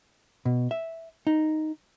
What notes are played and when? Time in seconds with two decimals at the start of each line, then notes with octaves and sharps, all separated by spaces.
0.45 B2
0.71 E5
1.27 D#4